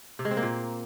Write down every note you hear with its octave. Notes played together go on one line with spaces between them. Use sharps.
C3
G#3
C4
A#3
A#2